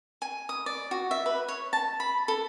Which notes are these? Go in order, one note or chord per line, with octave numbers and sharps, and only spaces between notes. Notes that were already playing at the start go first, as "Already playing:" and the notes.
G#5
D#6
D5
F#4
E5
B4
C#5
A5
B5
A4